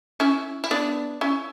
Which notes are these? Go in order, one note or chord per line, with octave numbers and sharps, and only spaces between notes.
C#4 E4
E4
B3 D4
C#4 E4